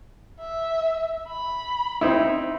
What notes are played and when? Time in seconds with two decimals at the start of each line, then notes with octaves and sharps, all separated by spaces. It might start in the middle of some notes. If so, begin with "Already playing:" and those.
0.39 E5
1.28 B5
2.01 C4 D#4 E4